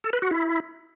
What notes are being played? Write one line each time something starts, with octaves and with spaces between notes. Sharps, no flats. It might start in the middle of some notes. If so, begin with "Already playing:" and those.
A4
B4
F#4
E4